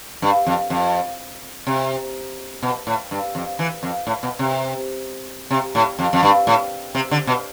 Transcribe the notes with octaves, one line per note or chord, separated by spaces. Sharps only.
G2
F2
F2
C3
B2
A2
G2
F2
E3
F2
A2
B2
C3
C3
A2
F2
F2
G2
A2
C3
D3
B2